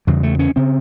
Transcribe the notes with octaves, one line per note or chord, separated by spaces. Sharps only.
E2 C#3 G3
A3
C#4
C#3 C4